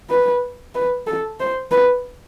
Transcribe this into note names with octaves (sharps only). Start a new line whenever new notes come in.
B4
B4
A4
C5
B4